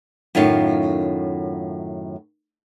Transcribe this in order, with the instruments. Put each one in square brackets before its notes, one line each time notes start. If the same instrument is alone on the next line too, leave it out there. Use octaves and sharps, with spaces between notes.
[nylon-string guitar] F#2 A2 D#3 F4 C#5 F5